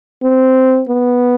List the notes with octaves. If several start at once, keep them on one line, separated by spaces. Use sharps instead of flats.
C4
B3